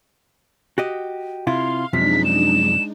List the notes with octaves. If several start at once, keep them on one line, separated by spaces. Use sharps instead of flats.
F#4 G4 D#5
C3 E4 F4 F5 C6
F#2 C3 F3 G#3 D4 D#4 B6
E7